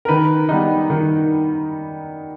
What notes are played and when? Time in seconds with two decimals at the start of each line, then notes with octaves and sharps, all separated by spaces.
0.05 A#4
0.08 D#3 B4
0.49 G3 B3 D#4
0.90 D#3